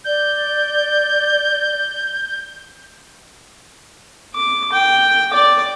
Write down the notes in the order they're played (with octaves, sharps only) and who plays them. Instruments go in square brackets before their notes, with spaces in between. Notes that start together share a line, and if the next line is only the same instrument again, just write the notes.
[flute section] D5 [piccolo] G6
[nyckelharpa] D6
G5
D5 D6